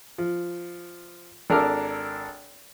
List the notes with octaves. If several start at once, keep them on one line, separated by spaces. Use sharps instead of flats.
F3
G#1 D4 A4 A#4 D6 F6